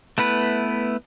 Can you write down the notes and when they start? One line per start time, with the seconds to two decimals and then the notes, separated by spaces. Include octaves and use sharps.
0.18 A3 B3 E4 B4